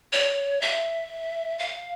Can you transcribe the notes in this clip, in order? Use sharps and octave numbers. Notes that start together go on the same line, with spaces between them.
C#5
E5
F5